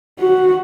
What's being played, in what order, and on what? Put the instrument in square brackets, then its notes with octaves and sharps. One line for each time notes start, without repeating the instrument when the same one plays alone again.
[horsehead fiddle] F#4